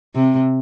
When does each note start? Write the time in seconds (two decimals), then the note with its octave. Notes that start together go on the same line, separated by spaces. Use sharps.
0.15 C3